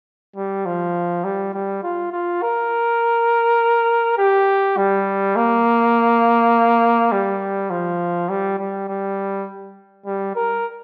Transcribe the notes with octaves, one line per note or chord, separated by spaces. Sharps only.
G3
F3
G3
G3
F4
F4
A#4
G4
G3
A#3
G3
F3
G3
G3
G3
G3
A#4